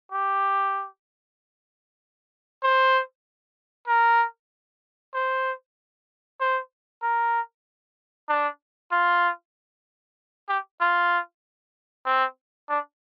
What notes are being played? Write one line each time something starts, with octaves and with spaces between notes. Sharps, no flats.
G4
C5
A#4
C5
C5
A#4
D4
F4
G4
F4
C4
D4